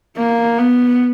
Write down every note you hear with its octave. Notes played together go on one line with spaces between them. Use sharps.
A#3
B3